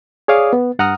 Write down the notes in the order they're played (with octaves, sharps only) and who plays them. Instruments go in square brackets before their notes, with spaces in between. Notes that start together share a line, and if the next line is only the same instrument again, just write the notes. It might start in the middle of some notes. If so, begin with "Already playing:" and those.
[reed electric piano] G#4 C#5 D5 F5 D6 D#6
B3
G2 F#5 A#5 D#6 F6